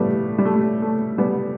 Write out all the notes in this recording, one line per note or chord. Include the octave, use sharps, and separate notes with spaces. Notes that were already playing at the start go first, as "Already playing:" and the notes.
Already playing: A2 F3 G3 A3 B3
G3
A3
A3
G3 B3